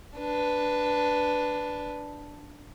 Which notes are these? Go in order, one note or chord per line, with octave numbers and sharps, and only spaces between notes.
D4 B4